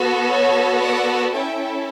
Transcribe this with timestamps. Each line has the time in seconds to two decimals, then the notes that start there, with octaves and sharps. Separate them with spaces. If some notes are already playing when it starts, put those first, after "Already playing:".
Already playing: B3 F#4 A4
0.31 C#5
0.81 D5 F#5
1.33 C#4 E4 A4 E5 G5